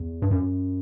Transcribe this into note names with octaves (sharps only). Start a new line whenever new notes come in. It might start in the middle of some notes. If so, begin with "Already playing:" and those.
Already playing: E2
G2
F#2